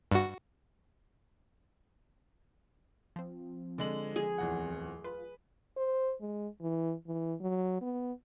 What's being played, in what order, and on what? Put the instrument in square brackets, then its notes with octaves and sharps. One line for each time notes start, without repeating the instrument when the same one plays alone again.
[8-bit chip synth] G2 F#4
[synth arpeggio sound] F3 C4
[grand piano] D3 G#3 F#7
[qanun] G#4
[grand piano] D1 E2 F#5
[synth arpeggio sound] F4 [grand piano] B4
[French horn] C5
G#3
E3
E3
F#3
B3